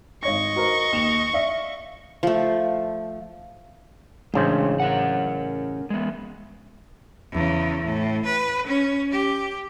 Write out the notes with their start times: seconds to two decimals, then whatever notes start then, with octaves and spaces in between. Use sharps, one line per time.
0.23 G#1 C#5 D#5 C#6 A#6
0.56 F#4 A#4 C5
0.92 D#2 E7 F7
1.33 D5 E5 F5
2.23 F3 A3
4.34 A1 C#3 G#3 D4 C5 C#5
4.80 C#4 A#4 F#5
5.90 G#3 B3
7.32 E2 C#3
7.85 A2
8.25 B4
8.67 C#4
9.11 G4